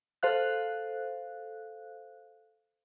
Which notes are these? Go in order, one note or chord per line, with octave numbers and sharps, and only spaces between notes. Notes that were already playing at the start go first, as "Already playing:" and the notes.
A4 C5 F5 F#6